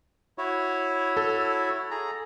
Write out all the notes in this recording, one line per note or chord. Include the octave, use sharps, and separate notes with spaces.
E4 F#4 C#5
A4
G#4 A#5